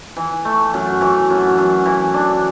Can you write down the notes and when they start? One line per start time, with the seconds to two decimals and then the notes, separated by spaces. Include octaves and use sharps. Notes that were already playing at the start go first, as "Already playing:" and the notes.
0.17 E3
0.45 A3
0.74 F#2
1.01 E3
1.30 F#2
1.58 F#2
1.86 E3
2.14 D4